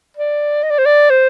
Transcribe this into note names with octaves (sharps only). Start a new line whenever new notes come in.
D5
D#5
D5
C5
D5
C5